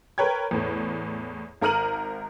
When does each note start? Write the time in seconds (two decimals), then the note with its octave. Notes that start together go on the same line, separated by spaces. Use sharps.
0.18 A#4 B4 C#5 G5 G#6
0.51 E2 A2
1.61 G#1 A#4 A#5 F6 D#7 F#7